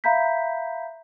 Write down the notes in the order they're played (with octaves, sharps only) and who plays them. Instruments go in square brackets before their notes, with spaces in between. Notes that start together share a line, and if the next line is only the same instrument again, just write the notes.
[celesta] E5 F5 A#5 B5 G6 B6